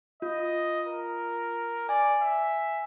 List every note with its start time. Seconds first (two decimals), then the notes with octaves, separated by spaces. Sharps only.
0.22 F4 D#5
0.88 A#4
1.89 D5 G#5
2.21 E5